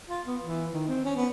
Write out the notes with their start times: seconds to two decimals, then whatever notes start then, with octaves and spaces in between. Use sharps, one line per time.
0.10 F4
0.27 B3
0.43 E3
0.74 D#3
0.88 C4
1.05 C#4
1.17 B3